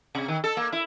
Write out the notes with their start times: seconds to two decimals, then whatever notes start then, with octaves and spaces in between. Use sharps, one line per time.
0.15 C3
0.28 D#3
0.44 A4
0.57 A#3
0.73 E4